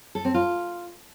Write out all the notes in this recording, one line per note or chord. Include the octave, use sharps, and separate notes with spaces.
A4
C4
F4